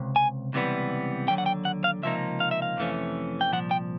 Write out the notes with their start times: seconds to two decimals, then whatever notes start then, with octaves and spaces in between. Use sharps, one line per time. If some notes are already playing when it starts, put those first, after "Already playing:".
Already playing: C#2 C3
0.16 G#5
0.53 C#2 C3 E3 G3 B3
1.28 D#2 D3 F#3 G5
1.38 F#5
1.46 G5
1.65 F#5
1.84 F5
2.03 C#2 C3 F3 A#3 D#4 E5
2.40 F5
2.51 E5
2.62 F5
2.77 F2 C3 E3 A3 C#4
3.41 G5
3.52 C2 A#2 F3 F#5
3.71 G5